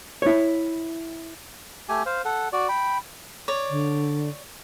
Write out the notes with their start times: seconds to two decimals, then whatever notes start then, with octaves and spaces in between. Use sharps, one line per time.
0.22 E4 C#5
1.89 A3 G4 G#5
2.06 C5 F5
2.25 A4 F#5
2.53 F#4 D5
2.69 G5 B5
3.48 C#5 D5
3.70 D3